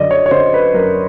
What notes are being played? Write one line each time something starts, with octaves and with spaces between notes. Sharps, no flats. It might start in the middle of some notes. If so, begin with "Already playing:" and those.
Already playing: F#2 D3 D5 D#5
C#5
C#5
D3 C5
B4
F#2 A#4